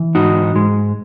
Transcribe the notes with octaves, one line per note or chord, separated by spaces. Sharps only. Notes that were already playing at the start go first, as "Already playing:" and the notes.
Already playing: E3
G#2 D#4 F#4
G#2 G#3